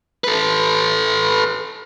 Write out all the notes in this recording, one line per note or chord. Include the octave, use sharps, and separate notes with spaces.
A4 B4